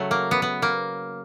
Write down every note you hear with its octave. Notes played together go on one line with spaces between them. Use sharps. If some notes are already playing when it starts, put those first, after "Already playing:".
Already playing: C#3 F#3 A3
A#3
B3
B3
A#3